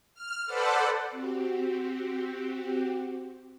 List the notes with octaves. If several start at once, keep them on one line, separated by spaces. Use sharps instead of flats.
F6
A4 B4 C5 D5 F#5
C4 F#4 G4